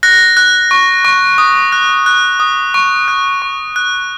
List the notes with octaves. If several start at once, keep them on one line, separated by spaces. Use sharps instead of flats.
F#6 A#6
F#6
C#6
C#6
D#6
F#6
F#6
D#6
C#6
F#6
C#6
F#6